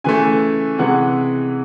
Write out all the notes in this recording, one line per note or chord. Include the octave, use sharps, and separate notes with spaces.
C#3 E3 A3 G#5
C3 E3 G#3 F#5